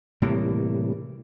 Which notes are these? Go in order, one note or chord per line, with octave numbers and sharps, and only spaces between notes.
A2 C3 E3 G3 A#3